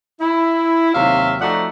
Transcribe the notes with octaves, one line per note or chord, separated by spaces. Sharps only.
E4
D#2 C3 F#3 E5 F5
F3 A3 D#4 F#4 D5 F#5